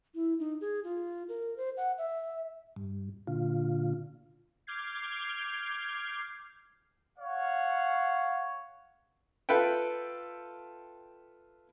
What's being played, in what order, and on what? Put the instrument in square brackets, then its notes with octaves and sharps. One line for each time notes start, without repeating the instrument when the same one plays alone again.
[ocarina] E4
D#4
G#4
F4
A#4
C5
F#5
E5
[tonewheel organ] G2
A#2 D3 F4
[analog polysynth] D6 F6 G6 G#6 C7
[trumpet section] C#5 F5 F#5
[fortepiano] F4 A4 B4 E5 G5